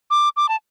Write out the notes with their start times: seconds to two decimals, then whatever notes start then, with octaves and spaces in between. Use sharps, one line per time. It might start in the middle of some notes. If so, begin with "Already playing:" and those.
0.11 D6
0.37 D6
0.49 A5